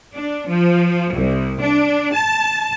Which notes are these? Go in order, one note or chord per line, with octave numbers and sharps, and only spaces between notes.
D4
F3
C2
D4
A5